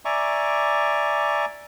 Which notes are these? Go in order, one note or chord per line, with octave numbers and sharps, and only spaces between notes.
D5 E5 G#5 A#5 C#6 D6